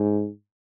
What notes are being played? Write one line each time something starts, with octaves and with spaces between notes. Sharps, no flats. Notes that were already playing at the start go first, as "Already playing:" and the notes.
Already playing: G#2